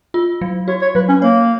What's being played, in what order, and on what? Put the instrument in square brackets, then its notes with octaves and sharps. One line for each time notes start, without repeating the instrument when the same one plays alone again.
[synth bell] F4
F#3
[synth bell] F#4 [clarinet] C#5
[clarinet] C#5
[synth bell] F#3 [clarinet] B4
[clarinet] C#4
[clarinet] A#3 [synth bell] C#5